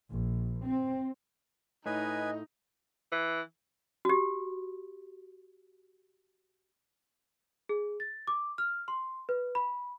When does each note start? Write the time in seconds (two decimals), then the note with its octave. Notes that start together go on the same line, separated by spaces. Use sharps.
0.11 A#1
0.65 C4
1.86 A2 D#4 B4 D#5 G#5
3.12 E3
4.05 F#4 G4
7.69 G#4
8.00 A6
8.27 D6
8.58 F6
8.88 C6
9.29 B4
9.55 B5